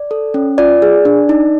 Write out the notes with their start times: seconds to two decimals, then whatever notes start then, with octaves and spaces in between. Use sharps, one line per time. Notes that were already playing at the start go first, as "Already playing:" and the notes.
Already playing: D5
0.11 A4
0.34 C#4
0.58 F4 D5
0.82 G#4
1.05 D4
1.29 D#4